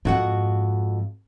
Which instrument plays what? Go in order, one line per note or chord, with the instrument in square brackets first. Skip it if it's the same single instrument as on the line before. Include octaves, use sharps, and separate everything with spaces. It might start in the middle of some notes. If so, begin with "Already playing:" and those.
[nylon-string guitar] F2 F#4 F#5 [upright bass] G#2